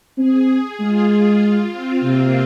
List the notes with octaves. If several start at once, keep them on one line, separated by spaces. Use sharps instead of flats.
C4 G#4
G#4
G#3 F4
F4
C4
C3 A#3